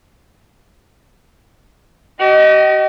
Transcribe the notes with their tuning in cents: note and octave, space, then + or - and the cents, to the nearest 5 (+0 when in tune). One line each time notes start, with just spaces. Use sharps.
G4 -45 D#5 +0